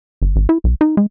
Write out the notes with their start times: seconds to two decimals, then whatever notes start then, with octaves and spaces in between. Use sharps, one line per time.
0.22 G1
0.36 G#1
0.49 E4
0.64 B1
0.81 D#4
0.97 G#3